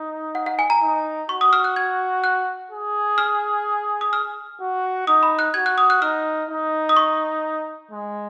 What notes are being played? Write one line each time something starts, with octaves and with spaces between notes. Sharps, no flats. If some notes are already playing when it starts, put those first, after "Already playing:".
Already playing: D#4
F#5
F#5
G#5
A#5
D#4
F#4 C#6
D#6
F6
F#6
G#6
F#6
G#4
F6
D#6
F6
F#4
D#4 D#6
B5
F#6
F#4 G#6
F#6
D#6
F#6
D#4 F6
D#4
D#6
C#6
G#3